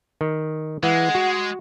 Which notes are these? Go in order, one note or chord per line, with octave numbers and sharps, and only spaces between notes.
D#3
E3 G#3 F#5
F#4